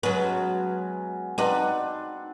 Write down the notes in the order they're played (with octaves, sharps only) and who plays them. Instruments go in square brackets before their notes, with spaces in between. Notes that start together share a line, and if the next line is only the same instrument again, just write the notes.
[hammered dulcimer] B2 G#3 C#4 [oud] F#3 B4
[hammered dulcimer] C4 D4 F#5 [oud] D#4 B4